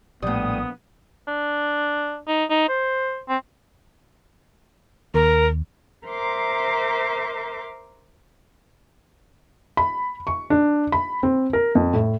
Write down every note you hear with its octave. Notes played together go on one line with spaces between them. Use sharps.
A#1 A2 G3 B3 D#6
D4
D#4
D#4
C5
C4
D#2 A#4
A#4 C5 E5 A#5 C6 D6
B5
C#6
D4
B5
C4
A#4
F2
A2